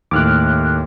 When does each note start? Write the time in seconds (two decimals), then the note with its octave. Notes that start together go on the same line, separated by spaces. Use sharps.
0.11 D#2 A2 D6 F6 F#6